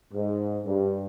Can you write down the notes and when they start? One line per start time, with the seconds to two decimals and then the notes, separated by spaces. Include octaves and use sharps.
0.13 G#2
0.65 G2